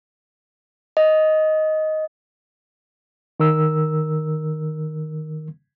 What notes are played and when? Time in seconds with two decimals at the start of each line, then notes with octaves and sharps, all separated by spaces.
0.97 D#5
3.40 D#3 A#4 E6